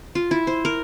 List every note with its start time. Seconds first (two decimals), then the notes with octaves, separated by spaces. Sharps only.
0.15 F4
0.31 E4
0.47 C5
0.65 A#4